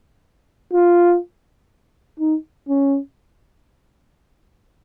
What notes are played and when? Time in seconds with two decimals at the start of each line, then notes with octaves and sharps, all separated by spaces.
0.73 F4
2.19 D#4
2.68 C#4